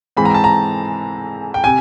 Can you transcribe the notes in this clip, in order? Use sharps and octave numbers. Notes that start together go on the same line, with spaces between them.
G#2 E3 G#3 C4 B5
A#5
A5
A#5
G5
C3 G#5